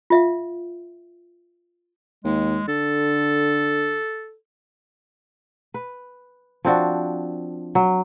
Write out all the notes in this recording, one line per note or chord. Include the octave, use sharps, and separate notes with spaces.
F4 E5 F5
D#2 G#3
D3 A4
B4
F3 C4 D4 F#4
F#3